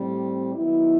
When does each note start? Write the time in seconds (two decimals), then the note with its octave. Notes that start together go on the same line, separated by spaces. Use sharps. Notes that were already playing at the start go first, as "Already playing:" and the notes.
Already playing: A2 G3 C4
0.55 D#3 F#3 B3 E4